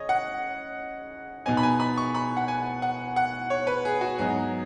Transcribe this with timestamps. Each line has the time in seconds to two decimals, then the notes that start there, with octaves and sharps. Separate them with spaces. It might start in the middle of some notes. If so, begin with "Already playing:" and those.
Already playing: C#3 C#5 D#5
0.09 F#5
1.46 B2 B3 D#4 G#5
1.57 B5
1.63 G#5
1.80 B5
1.97 C#6
2.15 B5
2.37 F#5
2.48 G#5
2.82 F#5
3.16 F#5
3.50 C#5
3.67 B4
3.85 G#4
4.01 F#4
4.18 G#2 F#3 B3 D#4 G#4